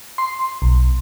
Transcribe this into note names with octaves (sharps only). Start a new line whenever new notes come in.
C6
B1